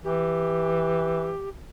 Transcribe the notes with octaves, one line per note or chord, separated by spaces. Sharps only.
E3 G4